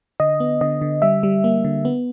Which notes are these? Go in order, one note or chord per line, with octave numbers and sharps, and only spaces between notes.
D3 D#5
B3
D3 D#5
D3
G3 E5
G3
A#3
D3
B3